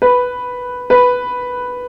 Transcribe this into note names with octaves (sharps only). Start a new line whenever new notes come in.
B4
B4